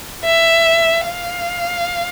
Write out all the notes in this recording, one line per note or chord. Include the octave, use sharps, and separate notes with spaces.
E5
F5